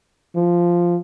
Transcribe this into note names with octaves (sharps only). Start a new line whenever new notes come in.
F3